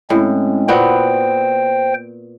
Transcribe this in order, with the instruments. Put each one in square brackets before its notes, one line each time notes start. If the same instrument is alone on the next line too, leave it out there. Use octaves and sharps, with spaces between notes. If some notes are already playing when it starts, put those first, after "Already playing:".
[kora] A2 [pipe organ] G#3 C4 C#4
[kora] A#2 B3 F#4 [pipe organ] C5 G5